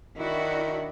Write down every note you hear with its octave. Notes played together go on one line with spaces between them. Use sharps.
D#3 D4 E4 F#4